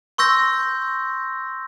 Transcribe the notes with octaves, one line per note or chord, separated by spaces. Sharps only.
C6 C#6 E6 G6 A#6